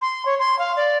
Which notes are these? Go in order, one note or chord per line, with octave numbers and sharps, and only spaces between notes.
C6
C#5
C6
F5
D5